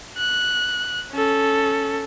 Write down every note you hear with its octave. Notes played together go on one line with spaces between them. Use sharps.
F#6
C#4 A4